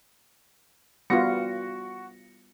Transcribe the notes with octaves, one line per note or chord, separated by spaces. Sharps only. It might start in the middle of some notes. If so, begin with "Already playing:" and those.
G3 B3 F4 F#4 A#6 C#7